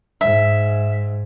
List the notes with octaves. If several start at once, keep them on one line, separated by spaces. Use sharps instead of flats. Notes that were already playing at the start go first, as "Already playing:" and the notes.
G#2 E5